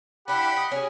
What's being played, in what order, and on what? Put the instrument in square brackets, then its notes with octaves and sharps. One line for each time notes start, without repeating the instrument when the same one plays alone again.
[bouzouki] D4 E4 [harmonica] G4 F#5 B5
[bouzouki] D#5
C#4 G4 G#4